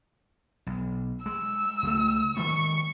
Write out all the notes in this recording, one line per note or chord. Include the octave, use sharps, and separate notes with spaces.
B1
G#3 E6
C#2 G#3 A3
D#3 G#3 A#3 C#6